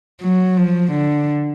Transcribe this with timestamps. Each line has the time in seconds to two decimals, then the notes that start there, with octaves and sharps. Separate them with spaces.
0.22 F#3
0.57 F3
0.92 D3